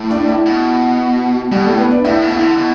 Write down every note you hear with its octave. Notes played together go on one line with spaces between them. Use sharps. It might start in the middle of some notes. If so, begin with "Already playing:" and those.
Already playing: A2
D4
E4
B2
B2 G3 G4
A2 A3 A4
B3 B4
D4 D5
A2 E4 E5
B2
E4 E5
D3
B2